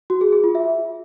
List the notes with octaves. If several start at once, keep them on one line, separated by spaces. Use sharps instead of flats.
F#4
G#4
G#4
F4
E5